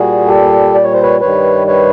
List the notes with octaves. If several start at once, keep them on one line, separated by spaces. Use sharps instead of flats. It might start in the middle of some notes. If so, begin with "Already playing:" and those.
Already playing: A#2 G3 F#4 G#4
G4 A4
D5
C#5
C5
B4 C#5
G2 D#3 G3 B4 C#5
B4 C#5